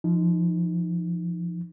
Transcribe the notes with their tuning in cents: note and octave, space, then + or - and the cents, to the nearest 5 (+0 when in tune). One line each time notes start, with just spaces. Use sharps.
F3 -20 D#4 +0